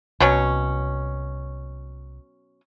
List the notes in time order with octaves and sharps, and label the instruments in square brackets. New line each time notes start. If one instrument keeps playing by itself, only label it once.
[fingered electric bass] C2 [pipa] B2 F#3 C#4